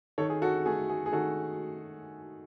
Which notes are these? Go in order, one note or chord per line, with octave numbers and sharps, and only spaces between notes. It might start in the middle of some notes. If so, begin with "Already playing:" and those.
D#3 A4 C#5
G#4
F#4 A4
A3 G#4
G#4
G#4
D#3 F#4 A4